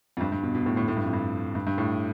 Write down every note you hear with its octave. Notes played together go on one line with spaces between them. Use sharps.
F2
G2
G2
B2
B2
A2
A2
A2
G2
F2
G2
G2
G2
A2